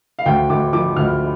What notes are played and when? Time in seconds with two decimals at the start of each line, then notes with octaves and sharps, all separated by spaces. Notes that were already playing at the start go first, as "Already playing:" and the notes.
0.19 F5
0.26 D2 G5
0.50 D2 D6
0.73 F3 D6
0.97 D2 F6